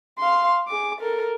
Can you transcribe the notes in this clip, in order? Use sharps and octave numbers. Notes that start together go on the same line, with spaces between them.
F5 C6
G#4 D6
A4 A#4